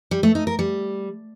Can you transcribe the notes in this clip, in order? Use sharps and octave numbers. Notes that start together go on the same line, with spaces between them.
G3
A3
D#4
A#4
G3